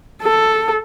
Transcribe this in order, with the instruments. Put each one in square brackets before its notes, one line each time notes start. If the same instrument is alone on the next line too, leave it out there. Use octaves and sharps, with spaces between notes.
[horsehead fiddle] A4